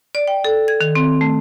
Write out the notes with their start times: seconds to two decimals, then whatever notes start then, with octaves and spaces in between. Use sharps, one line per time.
0.15 D5
0.28 G5
0.44 A4
0.68 G#6
0.81 D#3
0.95 C4
1.21 A3